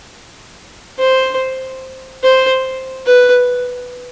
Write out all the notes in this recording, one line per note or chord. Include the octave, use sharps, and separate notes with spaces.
C5
C5
B4